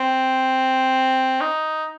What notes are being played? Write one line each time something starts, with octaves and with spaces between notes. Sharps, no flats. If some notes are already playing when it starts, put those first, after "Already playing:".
Already playing: C4
D#4